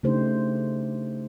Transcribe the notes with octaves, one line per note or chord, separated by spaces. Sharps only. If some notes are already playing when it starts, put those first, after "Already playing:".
C#3 A3 D4 D#4 G4 C5